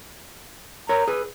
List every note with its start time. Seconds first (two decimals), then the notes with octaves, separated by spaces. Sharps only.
0.89 A#4 C#5 A#5
1.08 G#4 B4